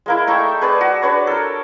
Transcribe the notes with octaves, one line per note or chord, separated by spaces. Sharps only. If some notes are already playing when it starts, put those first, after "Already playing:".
G#3 A#3 E4
A3 D#4 E5 G5
G#4 B4 D5 A5
F#4
D4 B4 C#5
A4 A#4